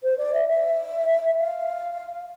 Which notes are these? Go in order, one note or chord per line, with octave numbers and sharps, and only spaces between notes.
C5
D5
E5
E5
F5